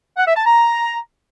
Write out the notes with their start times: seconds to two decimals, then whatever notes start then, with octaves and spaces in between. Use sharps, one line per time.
0.17 F#5
0.26 E5
0.36 A5
0.45 A#5